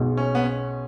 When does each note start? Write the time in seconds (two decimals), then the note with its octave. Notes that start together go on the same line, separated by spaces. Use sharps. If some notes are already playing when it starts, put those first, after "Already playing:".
Already playing: B1 B2 G#3
0.17 C#4
0.35 B3
0.44 C#4